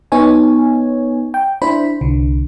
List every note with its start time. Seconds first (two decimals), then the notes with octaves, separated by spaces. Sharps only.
0.12 B3 D#4 C#5 G#5
1.34 G5
1.62 D4 E4 C5 B5
2.01 C2 D3